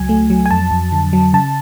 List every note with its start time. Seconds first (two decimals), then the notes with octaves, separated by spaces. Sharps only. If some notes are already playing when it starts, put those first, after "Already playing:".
Already playing: C#2 F#3 G#5
0.09 A3
0.30 F#3
0.46 G#5
0.51 F2 A5
0.71 F2
0.92 D3
1.13 F#3
1.33 C#3 A5